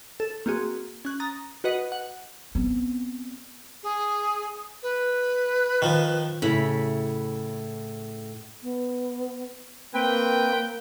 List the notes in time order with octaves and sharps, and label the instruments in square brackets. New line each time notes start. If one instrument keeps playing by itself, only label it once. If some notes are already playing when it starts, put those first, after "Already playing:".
[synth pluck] A4
A#3 C4 F#4 G#4
C#4 F#6
A#5 D#6 A6
F#4 B4 D#5 F#5
F#5
[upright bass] B3 C4
[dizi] G#4
B4
[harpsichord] D#3 F3
[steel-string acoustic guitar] A2 [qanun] C#3 E4 B5
[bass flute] B3
[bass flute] A#3 [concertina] C4 B4 [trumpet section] G5